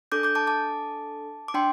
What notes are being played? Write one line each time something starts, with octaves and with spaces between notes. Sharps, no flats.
D4 A4 D6 G6
D6 G6
A5 D6
A5 D6
D6
D4 G5 C6